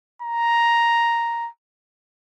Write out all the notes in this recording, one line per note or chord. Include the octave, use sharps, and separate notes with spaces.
A#5